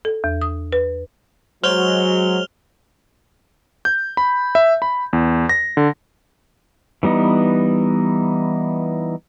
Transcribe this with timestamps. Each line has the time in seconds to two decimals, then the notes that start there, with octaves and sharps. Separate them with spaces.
0.05 A4
0.24 E2
0.42 D#6
0.72 B4
1.64 F#3 G#3 F#4 C5 C#5 F6 F7 G7
3.85 G6
4.17 B5
4.55 E5
4.82 B5
5.13 E2
5.49 A#6
5.77 D3
7.03 E3 G3 B3 D#4